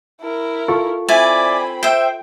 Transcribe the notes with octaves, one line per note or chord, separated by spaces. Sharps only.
E4 A#4
F4 A4 C#6
C4 E4 D5 G#5 B5
C5 E5 G5